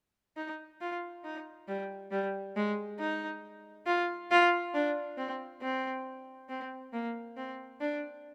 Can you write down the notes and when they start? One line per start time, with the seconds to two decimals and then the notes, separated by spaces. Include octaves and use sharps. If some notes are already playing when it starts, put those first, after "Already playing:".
0.37 D#4
0.81 F4
1.24 D#4
1.68 G3
2.11 G3
2.56 G#3
2.99 D#4
3.86 F4
4.31 F4
4.74 D4
5.18 C4
5.62 C4
6.49 C4
6.93 A#3
7.37 C4
7.81 D4